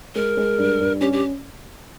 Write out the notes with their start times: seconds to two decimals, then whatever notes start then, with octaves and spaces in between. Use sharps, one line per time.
0.15 G#3 A#4
0.37 G#3
0.58 G2
0.80 G2
1.01 C#4 G4
1.12 G4